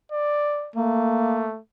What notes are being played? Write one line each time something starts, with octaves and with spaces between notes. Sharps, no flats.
D5
A3 A#3